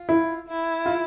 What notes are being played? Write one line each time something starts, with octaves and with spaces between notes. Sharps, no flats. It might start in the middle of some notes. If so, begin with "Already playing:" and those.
Already playing: F4
E4
E4
F4